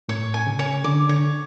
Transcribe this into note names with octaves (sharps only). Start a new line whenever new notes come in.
A2 C#5
G#5
C#3
C#5
D3 D6
D3 C#5